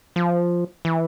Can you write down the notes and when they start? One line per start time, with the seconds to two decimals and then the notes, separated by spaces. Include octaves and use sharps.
0.16 F3
0.85 E3